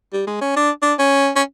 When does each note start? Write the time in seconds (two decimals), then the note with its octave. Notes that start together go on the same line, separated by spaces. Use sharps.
0.13 G3
0.27 G#3
0.42 C#4
0.57 D4
0.83 D4
0.99 C#4
1.36 C#4